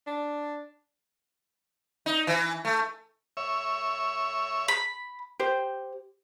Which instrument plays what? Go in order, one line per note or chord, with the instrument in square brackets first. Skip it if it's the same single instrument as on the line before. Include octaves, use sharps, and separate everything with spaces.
[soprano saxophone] D4
[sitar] D#4
E3
A3
[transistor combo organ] C#5 E5
[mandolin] B5
[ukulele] G4 C5